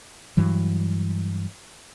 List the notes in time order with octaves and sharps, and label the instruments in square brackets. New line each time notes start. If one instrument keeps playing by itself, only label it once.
[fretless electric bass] G2 E3 F#3